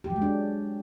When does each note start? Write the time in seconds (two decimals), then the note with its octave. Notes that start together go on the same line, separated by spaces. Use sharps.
0.04 G4
0.10 F#3
0.16 G#3
0.22 D4